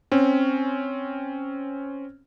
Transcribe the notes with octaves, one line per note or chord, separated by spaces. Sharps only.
C4 C#4